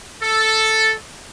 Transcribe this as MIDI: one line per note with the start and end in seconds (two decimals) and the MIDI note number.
0.22 0.93 69